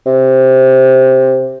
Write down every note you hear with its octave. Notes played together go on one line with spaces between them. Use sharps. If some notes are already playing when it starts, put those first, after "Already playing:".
C3